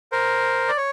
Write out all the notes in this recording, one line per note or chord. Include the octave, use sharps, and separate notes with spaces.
A#4 C5
D5
C#5